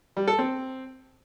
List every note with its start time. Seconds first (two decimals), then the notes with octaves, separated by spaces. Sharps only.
0.17 G3
0.28 A4
0.39 C4